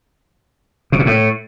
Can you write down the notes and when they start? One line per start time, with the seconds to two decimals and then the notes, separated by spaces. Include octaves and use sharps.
0.92 B2
0.99 A#2
1.06 A2